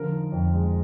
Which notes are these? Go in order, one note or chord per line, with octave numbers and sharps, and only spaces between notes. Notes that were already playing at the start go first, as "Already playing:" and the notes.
Already playing: D3 F3 A#4
D#4
F2
G#3